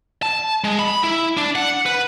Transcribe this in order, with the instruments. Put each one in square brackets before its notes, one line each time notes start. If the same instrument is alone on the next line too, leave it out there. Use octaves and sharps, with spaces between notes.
[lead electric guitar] A5
G#3
B5
E4
D4
F#5
B4